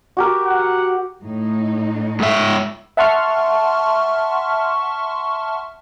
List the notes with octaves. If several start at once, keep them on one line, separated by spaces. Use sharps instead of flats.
F#4 G4 A#4
F#5
A2 D#4
G#2 E5
E5 F#5 A5 C6 C#6 F6